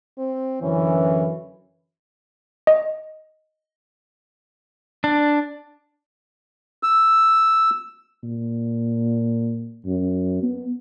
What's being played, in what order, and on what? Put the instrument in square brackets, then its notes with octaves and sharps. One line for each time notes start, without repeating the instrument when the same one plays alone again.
[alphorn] C4
[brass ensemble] F#2 D3 E3 [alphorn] C#4
[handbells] D#5
[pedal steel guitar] D4
[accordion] E6
[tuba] A#2
F#2
B3